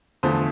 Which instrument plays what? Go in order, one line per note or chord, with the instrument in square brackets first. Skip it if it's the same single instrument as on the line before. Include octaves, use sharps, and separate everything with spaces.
[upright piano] E2 D3 F3 A3 C5